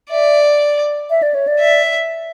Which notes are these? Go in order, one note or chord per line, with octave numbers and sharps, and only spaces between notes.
D5 E5
E5
D5
C#5
D5
E5